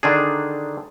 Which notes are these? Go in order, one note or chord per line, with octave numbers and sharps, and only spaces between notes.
D3 D#3 D4 G#4